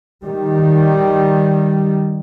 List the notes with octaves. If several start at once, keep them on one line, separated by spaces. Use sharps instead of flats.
D#3 G3